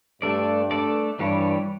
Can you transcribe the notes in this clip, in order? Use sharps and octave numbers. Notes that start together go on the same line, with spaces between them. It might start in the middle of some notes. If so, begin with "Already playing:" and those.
G2 A3 D4 A4 D5
A3 D4 A4 D5
G2 E3 G3 D4 G4 C#5